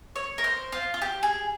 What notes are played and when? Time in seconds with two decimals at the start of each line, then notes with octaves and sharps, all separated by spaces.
0.16 C#5
0.38 A#4
0.44 C5
0.72 F4
0.94 F4
1.02 G4
1.23 G#4